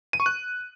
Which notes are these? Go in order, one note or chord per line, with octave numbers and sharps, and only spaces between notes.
D#7
C#6
F#6